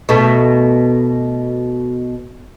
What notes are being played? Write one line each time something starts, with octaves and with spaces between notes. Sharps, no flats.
B2 A3